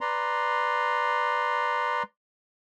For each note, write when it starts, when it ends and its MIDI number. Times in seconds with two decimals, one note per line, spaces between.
0.01 2.03 71
0.01 2.03 74
0.01 2.03 82
0.01 2.03 84